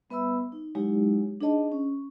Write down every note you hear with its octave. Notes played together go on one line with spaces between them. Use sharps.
G3 B3 B4 E5 B5 E6
D#4
F#3 G#3 D#4 E4 G4 C#5
D4 D#4 G#4 C#5 D#5 A5
C#4